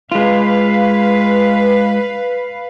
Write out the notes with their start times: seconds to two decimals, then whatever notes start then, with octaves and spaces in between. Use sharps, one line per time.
0.12 G#3 F4 B4 F5